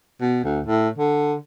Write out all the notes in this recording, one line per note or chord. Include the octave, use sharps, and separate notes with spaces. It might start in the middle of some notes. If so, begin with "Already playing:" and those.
B2
D2
A2
D3